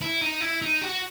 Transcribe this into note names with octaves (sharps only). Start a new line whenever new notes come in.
E4
D#4
E4
D#4
F#4